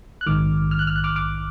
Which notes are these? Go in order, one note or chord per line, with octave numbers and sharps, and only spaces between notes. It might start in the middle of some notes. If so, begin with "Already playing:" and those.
F#6
A#1 G#2 D#3 D6 F6
F6
F#6
F6
F#6
D6 F6
D6 F6